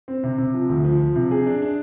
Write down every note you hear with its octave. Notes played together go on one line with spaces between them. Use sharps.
C4
C3
C3
F3
D2
F3
F3
C3
G#4
D4
D4